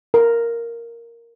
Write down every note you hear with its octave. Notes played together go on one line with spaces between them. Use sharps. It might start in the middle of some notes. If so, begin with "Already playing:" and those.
A#4